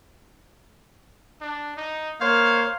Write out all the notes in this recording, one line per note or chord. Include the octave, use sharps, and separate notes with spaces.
D4
D#4
A#3 C5 C#5 F5